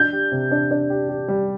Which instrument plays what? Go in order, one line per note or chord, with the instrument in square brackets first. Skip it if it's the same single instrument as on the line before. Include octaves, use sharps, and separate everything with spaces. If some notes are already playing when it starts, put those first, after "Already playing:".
Already playing: [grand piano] D4 [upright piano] G6
[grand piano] G4
C3
D4
D4
G4
G4
G3